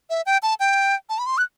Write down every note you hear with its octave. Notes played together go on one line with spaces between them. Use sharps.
E5
G5
A5
G5
A5
B5
C6
F#6